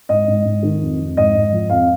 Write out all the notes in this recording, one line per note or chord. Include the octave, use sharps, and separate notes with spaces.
G#2 D#5
G#2
G#2
D#3
F2
F2
G#2 D#5
G#2
F3
F2 F5